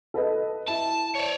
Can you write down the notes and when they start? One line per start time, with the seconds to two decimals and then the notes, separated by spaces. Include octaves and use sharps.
0.14 A4 B4 D#5
0.68 E4 A5
1.15 C#5 D5